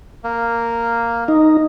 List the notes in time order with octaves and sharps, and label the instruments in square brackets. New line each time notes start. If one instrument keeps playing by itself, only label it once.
[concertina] A#3
[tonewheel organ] D#4